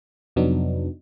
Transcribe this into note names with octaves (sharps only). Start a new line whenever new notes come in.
F2 C3 F#3 B3 D4 D#4